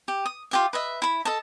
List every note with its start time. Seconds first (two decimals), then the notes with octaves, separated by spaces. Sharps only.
0.08 G4
0.25 D#6
0.51 F4 G4 E5
0.73 B4 D#5 E5
1.02 E4 B5
1.25 A4 D#5 A5